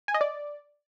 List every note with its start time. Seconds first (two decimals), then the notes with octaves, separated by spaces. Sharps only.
0.08 G#5
0.14 D#5
0.21 D5